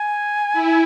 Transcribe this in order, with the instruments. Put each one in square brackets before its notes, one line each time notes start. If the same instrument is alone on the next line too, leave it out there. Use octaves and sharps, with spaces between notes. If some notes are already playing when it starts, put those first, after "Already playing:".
Already playing: [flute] G#5
[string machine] E4